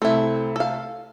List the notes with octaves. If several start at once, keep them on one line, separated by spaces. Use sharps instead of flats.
C2 A3 C4 E4
A4 F5